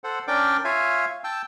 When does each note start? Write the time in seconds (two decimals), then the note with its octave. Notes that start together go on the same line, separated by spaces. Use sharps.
0.04 A4 C5 F#5
0.28 C#4 D4 A#4 D5 G5 D6
0.64 F4 C#5 E5 F5 G#5
1.24 G5 A5 E6